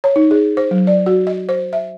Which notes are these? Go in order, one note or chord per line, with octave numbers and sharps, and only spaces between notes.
C#5
D#4
G#4
C5
F#3
D5
F#4
D#5
C5
E5